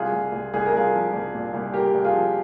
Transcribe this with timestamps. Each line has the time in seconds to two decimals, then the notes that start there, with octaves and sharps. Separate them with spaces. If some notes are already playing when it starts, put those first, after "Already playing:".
Already playing: C2 F4 G#4
0.13 C2
0.32 C2
0.54 C2 G#4
0.66 A#4
0.73 C2 F4 G#4
0.93 F3
1.13 C2
1.34 A#2
1.54 C2
1.74 C2 G4 A#4
1.95 C2
2.04 F4 G#4
2.15 F3